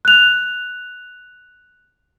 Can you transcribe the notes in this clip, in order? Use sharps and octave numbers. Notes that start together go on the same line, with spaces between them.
F#6 F7